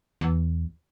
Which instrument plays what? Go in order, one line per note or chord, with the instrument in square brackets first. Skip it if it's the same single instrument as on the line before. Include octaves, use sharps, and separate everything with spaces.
[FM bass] E2